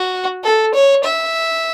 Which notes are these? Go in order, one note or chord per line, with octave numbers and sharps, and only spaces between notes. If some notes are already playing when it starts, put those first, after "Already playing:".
Already playing: F#4
A4
C#5
E5